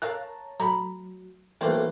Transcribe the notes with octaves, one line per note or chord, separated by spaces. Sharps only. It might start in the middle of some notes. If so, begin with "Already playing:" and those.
A4 A#4 C#5 F5 A5 A#5 F#6
F#3 A3 A#5 B5
B1 E3 A3 A#3 C4 B4 C5